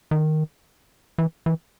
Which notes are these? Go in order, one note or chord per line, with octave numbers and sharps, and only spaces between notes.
D#3
E3
E3